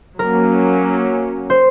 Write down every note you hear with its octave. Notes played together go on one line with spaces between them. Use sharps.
F#3 A#3 C#4 A#4
C5